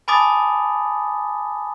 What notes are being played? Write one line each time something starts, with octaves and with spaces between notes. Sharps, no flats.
G#5 A5 B5 D6 D#6 A6